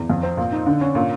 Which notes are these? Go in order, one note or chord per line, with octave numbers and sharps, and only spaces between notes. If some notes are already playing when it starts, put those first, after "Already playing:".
Already playing: E2
F2
C4
A#2
D#4
D3
C#4
A#2